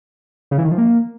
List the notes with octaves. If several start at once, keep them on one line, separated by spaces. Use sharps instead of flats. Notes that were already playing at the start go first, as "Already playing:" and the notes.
C#3
E3
D#3
F3
A#3